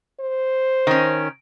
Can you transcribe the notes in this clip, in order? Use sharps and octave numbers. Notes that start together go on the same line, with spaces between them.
C5
D#3 C#4